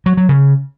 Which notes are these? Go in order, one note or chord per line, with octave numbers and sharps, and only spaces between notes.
F#3
F#3
C#3